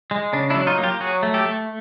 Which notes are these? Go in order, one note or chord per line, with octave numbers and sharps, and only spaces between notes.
G#3
C#3 D4
D4 E4
F#3
D#4 F4
A#3
F4 G4
F#3 F#4 G#4
A3
G4 A4
A3